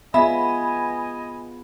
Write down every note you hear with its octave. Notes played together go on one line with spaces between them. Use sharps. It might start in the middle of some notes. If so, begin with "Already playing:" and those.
B3 F4 G#4 D#5 E5 G#5 B5